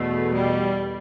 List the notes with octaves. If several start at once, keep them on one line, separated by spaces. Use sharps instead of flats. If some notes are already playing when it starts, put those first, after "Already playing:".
Already playing: E2 B2 A3
G3